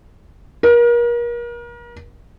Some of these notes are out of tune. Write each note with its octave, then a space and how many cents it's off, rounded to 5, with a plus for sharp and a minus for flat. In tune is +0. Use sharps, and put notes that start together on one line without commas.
A#4 +35